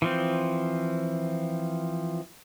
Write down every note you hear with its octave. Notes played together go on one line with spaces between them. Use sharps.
E3 F3 C4